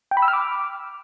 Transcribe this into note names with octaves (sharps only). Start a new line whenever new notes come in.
G5
B5
E6
F6
D6